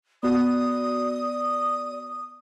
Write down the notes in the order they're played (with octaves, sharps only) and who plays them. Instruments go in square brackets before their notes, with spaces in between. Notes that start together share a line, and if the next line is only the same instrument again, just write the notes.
[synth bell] B3 F#4 [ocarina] D5 [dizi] D#6